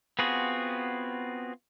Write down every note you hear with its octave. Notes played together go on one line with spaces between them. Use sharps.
B3 C4 F4 F#4 G#4